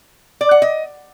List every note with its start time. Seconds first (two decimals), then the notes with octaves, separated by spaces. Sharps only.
0.41 D5
0.51 F#5
0.62 D#5